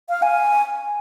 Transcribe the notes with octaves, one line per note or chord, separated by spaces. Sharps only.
F5
G#5